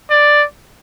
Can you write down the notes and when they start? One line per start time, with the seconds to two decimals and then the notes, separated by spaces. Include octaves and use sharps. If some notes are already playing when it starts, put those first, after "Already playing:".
0.10 D5